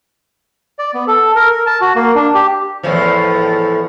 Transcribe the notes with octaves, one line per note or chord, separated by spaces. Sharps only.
D5
B3
A4
A#4
A#4
A5
F#4
A#3
D4
G4
E2 A2 F3